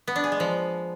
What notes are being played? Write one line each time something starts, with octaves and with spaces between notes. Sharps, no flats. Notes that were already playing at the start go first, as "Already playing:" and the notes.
B3
D4
G#4
G#3
F3